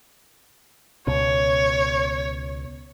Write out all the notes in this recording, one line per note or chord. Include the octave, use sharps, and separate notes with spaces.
C#2 B2 C#5